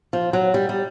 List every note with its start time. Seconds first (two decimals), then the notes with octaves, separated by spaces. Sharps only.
0.13 F3
0.33 F#3
0.54 G3
0.69 G3